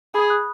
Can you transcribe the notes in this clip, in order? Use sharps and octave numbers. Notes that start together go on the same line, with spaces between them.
G#4 B5 D#6
D#6 F#6